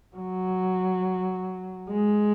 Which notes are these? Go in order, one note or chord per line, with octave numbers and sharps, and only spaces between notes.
F#3
G#3